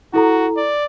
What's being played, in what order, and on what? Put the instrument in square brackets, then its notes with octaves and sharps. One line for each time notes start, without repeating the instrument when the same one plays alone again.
[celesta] E4 A4 A#5 [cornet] F#4
[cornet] D5